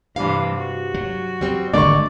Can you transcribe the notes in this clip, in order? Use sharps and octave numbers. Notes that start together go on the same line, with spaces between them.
G2 C3 E3 F5
F#4
F#3
G3 C4
G#1 D3 G3 A3 A#3 D5 C#6